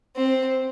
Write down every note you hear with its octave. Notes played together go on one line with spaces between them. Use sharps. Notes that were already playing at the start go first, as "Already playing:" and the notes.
C4